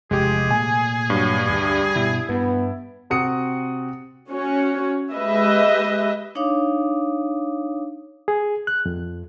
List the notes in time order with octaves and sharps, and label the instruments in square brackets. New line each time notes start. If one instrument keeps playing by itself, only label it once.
[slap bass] F1 E2 [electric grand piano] G#3 G4 [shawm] G#4
[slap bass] A#2 A3 [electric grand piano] G#5
[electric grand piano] G2 [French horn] F#3
[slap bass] D2 [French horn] G3
[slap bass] G2 B2 [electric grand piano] E4
[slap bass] G2 [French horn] B3
[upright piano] C3 C4 F#4 D#6 C#7
[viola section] C#4 F#4 C#5
G#3 G4 B4 D#5 E5
[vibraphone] D4 D#4 C#5 F5 D6 D#6
[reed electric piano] G#4
F#6
F2